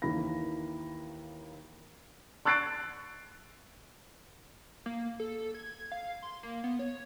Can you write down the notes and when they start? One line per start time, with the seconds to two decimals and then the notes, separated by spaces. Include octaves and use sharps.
0.02 D#2 E3 A#3 D#4 B5 A#6
2.45 C#6 E6 F#6 A6 C7 D7
4.86 A#3
5.20 A4
5.54 G#6
5.92 F5
6.22 C6
6.43 A#3
6.64 B3
6.79 C#5